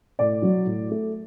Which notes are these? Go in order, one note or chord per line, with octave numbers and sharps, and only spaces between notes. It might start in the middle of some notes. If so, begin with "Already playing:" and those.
A2 D5
F#3
A2
A3